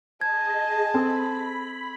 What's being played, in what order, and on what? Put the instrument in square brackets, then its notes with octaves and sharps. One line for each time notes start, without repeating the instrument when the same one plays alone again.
[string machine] G#4 D#5 [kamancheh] A5 [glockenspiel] G#6
[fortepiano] C4 A4 [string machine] B5